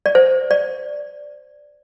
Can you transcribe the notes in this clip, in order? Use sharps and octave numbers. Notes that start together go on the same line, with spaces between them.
D5
C5
D5